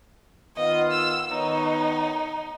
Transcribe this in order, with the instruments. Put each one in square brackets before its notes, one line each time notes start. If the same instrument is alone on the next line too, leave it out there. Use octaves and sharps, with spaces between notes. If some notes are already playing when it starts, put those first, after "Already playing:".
[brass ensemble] D#3 B3 F4 [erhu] D#5
[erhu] E6
[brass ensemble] D#3 B3 C#5 [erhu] D#4